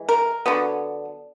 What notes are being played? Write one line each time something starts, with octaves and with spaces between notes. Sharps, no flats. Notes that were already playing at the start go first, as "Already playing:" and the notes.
Already playing: E3 G#3
A#4
D3 F#3 B3